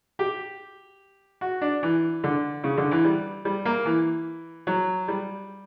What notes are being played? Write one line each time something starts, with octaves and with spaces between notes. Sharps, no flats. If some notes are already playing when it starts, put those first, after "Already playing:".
G4
F#4
D4
E3
D3
C#3
D3
E3
G3
G3
A#3
E3
F#3
G3